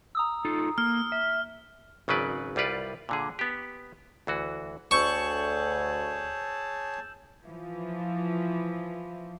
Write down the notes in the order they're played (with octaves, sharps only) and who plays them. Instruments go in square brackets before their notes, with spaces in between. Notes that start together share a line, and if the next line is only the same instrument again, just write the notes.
[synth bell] A#5 D#6 E6
[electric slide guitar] D#4 F4 A4
[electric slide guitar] A#3 [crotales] F6
[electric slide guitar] E5
[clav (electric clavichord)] G#1 C#3 F#3 B4 D5
C2 G3 F4 B4 D5
A#2 D3 G#4
B3 G4
D2 E3 F#4
[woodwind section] D2 [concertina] G#4 C#5 A5 [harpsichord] C#6 [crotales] E6 G6 E7
[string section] E3 F3